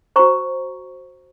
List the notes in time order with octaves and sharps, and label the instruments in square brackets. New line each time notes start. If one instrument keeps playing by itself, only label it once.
[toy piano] F#4 C5 A#5 C#6